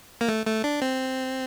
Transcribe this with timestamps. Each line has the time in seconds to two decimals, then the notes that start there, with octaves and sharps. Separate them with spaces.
0.21 A#3
0.29 A3
0.46 A3
0.64 D4
0.82 C4